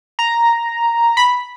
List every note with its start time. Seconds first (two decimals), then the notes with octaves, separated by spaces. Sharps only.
0.19 A#5
1.17 B5